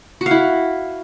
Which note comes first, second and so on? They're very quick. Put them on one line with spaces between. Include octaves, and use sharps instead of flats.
F#4 F5 E4